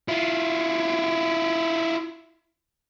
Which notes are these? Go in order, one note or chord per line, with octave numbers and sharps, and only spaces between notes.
E4 F4